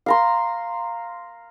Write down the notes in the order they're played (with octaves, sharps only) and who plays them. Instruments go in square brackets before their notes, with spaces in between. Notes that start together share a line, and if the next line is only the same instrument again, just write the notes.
[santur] F5 A#5 C6